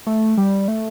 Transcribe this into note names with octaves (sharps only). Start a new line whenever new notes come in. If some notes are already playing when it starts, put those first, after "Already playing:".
A3
G3
A3